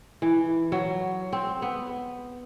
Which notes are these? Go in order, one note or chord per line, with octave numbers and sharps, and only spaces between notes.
E3
F#3
C4
B3